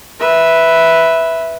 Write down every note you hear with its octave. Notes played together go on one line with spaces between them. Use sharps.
B4 E5